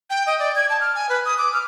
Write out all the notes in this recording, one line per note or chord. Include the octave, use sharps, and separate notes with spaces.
G5
D#5
D5
G#6
A5
F6
G#5
B4
D#6
D6
F6